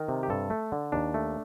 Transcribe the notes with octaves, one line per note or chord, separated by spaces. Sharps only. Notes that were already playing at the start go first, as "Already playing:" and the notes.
Already playing: D#3 A#4
C3
G4
G2 A4
A3
D3
D#2 D4
A3